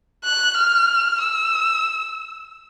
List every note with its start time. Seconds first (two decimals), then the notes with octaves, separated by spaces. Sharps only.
0.25 F#6
0.57 F6
1.21 E6